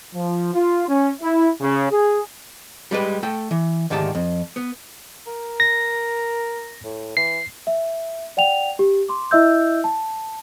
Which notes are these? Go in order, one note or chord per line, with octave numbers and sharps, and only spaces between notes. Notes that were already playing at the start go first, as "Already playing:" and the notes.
F3
F4
C#4
E4
C#3
G#4
G3 G#3 G4 B4
A3 A4 G5
E3
D2 G#2 D#3 G4 A5
F2
B3
A#4
A#6
A2
E3 C7
E5
D5 F#5 G5 F7
G4
C6 D6
E4 D#5 E5 E6 G6
A5